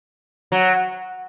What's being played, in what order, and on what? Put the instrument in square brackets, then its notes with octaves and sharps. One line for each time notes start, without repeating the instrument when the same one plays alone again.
[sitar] F#3